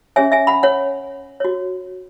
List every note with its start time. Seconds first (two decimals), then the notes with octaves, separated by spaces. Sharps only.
0.16 C#4 G#4 C#5 E5 G#5
0.32 E5 G#5
0.47 F#5 B5
0.63 C#5 F#5
1.40 F#4 C#5